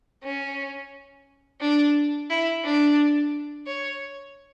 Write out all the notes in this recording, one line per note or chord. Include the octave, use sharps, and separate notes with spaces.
C#4
D4
E4
D4
C#5